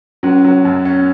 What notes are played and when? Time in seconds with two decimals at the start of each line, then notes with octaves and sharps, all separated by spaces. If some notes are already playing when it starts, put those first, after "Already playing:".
0.23 F#3 C#4
0.45 F#3
0.65 F#2
0.85 C#4